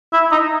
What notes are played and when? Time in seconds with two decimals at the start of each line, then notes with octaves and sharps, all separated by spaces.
0.13 E4
0.32 D#4